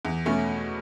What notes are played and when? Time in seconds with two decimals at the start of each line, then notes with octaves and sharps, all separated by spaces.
0.05 E2
0.26 B2 A3 C#4